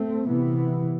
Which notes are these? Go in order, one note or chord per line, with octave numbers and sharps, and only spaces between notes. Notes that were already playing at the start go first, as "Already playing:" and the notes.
Already playing: A3 C4
C3 E3 B3